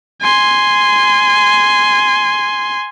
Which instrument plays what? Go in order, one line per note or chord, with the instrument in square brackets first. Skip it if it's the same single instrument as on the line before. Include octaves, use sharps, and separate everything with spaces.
[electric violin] G#5 C6